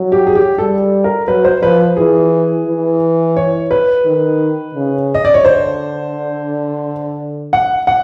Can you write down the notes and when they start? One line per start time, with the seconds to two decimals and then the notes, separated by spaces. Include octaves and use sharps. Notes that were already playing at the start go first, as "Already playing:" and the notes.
Already playing: F#3
0.12 G4
0.27 G#4
0.35 G4
0.58 G3 A4
1.04 A#4
1.28 F#3 B4
1.44 C5
1.62 F3 B4
1.97 E3 G#4
2.66 E3
3.37 C#5
3.71 B4
4.05 D#3
4.74 C#3
5.14 D#5
5.25 D5
5.34 C#5
5.45 D3 C5
7.53 F#5
7.87 F#5